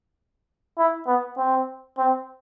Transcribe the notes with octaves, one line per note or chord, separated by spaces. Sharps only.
E4
B3
C4
C4